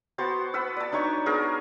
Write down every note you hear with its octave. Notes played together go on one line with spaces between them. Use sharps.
B3 F#4 C5 A5
B4 F#5 E6
D5 A5
D4 D#4 C#5 C#6
B3 G#4 A#4